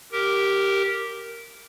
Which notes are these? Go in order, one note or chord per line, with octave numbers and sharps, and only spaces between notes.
G4 A#4